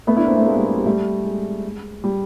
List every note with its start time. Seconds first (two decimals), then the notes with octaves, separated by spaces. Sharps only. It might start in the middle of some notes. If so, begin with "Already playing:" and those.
0.07 A3 B3
0.17 D4 E4
0.27 A#3 C4
0.36 A3 B3
0.46 G#3 A#3
0.56 G3 A3
0.66 G#3
0.76 G3
0.86 G3 A3
1.24 G#3
2.04 G3